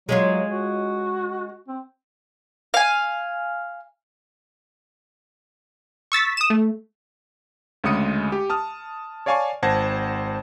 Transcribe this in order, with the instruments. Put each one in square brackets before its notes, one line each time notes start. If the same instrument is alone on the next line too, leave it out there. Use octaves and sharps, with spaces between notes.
[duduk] F#3 [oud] G#3 C#4 F4
[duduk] F#4
C4
[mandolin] F5 G#5
[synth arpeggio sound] C#6 E6 A6 B6
D#6 E7
A3
[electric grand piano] D2 C#3 G#3 D#6 C#7 D#7
G4
A5 D#6 F6
C#5 D5 F5 G#5 A5 C#6
G#1 C5 F#5 A5 G#6 A#6